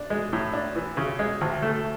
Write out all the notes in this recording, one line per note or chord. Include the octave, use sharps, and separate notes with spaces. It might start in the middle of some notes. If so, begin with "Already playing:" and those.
Already playing: D4
G#3
A2
D4
E3
C#3
G#3
D2
A3